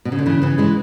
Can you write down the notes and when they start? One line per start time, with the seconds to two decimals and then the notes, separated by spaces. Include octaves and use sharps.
0.05 B2
0.12 C#3
0.19 D3
0.26 C#3 E3
0.42 C#3 E3
0.58 E3 G#3